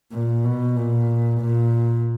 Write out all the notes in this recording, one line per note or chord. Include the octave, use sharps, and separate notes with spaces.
A#2
B2
A#2
A#2